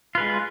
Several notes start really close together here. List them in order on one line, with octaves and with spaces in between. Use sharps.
F4 B4 G#3